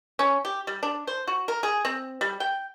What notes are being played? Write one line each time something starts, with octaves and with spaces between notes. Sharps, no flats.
C#4
G4
G3
D4
C5
F#4
A#4
G#4
C4
G3
G5